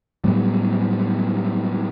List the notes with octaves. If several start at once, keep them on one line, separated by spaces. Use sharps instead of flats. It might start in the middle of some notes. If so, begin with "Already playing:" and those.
A2 F#3 G3 B3